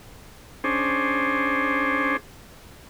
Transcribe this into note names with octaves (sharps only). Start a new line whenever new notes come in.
C#4 D4 G#4 C5